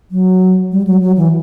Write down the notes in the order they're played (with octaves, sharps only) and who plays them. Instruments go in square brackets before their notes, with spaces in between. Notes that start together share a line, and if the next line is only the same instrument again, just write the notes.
[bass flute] F#3
G3
F#3
F#3
E3